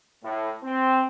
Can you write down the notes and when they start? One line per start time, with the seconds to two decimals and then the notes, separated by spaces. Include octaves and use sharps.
0.24 A2
0.64 C4